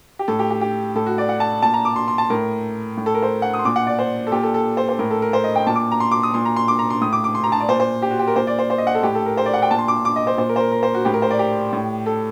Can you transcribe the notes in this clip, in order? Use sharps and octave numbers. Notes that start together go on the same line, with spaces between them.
G4
A2 A4
G4
G4
G4
A2 A4
F#4
D5
F#5
A5
A#2 A5
A#5
D6
C6
C6
A5
A2 A#4
A2
A4
A#4
C5
F#5
D#6
C6
A#2 D6
F#5
D5
C5
A4
A#2 G4
A4
A4
C5
C5
A2 A#4
A4
A#4
C5
D#5
G5
A#2 A5
D6
A#5
C6
D6
D#6
A#2 C6
A#5
C6
D6
A#5
C6
A2 D#6
D6
D6
C6
A#5
A5
D5
A#2 C5
C5
G4
F#4
G4
A#4
A#2 C5
D5
C5
C5
D#5
F#5
A4
A2 G4
A4
A#4
C5
D5
F#5
G5
A#2 A5
C6
D6
D6
D#5
C5
A#2 C5
A#4
C5
A#4
A#4
C5
F#4
A2 G4
A#4
C5
D5
G4
A2
A4